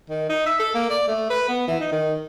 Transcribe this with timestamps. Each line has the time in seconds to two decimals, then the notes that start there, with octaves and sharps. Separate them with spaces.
0.10 D#3
0.29 D#4
0.46 E5
0.60 A4
0.75 A#3
0.90 D5
1.08 A3
1.30 B4
1.48 B3
1.68 E3
1.80 D#4
1.92 D#3